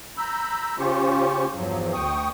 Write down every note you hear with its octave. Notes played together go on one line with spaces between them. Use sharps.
A#5 B5 E6 G6
C#3 C#4 F4 G4 C5 C#6
E2 G2 F3 F#3
D2 G5 C#6 D#6